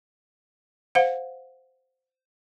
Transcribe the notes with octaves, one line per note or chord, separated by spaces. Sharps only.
C5 F5 F#5